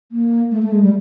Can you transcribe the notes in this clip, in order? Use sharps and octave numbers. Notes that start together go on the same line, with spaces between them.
A#3
A3
A3
G#3
G3